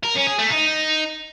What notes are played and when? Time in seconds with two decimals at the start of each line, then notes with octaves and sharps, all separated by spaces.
0.03 A#4
0.15 C#4
0.27 G#4
0.39 A3
0.50 D#4